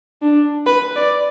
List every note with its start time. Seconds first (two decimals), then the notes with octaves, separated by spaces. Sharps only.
0.22 D4
0.66 B4
0.96 D5